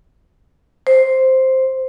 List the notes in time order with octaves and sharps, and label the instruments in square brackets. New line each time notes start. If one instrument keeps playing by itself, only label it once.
[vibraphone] C5